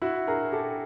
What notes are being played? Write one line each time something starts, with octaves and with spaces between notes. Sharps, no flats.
E4 F#4
G#4 A#4
G4 A4